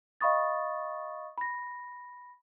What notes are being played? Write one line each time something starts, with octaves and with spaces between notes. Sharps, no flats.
D#5 F5 B5 C#6 D#6 A6
B5 A#6